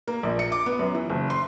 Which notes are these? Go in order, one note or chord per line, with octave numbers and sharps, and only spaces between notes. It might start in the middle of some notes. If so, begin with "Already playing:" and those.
A#3
A#1
C#7
D6
B3
F#2
E3
F#1
C6